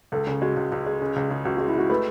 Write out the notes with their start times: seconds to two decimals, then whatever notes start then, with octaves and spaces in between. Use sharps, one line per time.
0.12 C#2 A4
0.27 C#3 G#4
0.42 G#3 F#4
0.56 C#2
0.72 C#2
0.86 G#3
1.01 C#3
1.16 C#2
1.30 C#3
1.45 C#2 F#4
1.57 F#4
1.60 G#3
1.68 E4
1.75 G#3 F#4
1.89 A3 B4